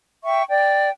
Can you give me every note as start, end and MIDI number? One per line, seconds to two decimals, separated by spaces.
0.24 0.42 76
0.24 0.42 79
0.24 0.42 85
0.48 0.88 74
0.48 0.88 79